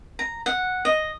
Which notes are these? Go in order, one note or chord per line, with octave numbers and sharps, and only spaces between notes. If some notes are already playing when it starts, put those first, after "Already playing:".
A#5
F#5
D#5